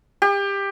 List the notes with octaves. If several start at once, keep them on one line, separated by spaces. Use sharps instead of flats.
G4